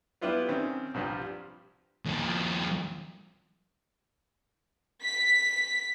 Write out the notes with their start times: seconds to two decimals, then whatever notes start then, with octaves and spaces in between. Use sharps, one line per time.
0.21 G3 B3 D4 E4 F4 B4
0.49 D#3 C4 C#4
0.94 C2 G2 F3 G3 F4
2.05 D#2 F3
5.03 B6